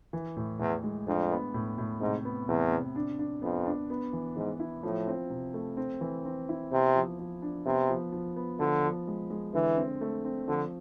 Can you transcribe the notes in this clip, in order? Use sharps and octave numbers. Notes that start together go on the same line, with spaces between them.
E3
A2
E2 A2
G#3
F2 D4
B3
A2
A2
G#2 C3
B3
E2 C3
C3
D4
D4
F2 B3
D4
B3
E3
G#2 E3
E4
A2 F3
C4
C3
A3
C4
E3
C4
E4
C3 B3
F3
F3
D4
C3 B3
F3
F3
B3
D3 F3
F3
G#3
G#3
D3 E3
C4
A3
C4
D3 F3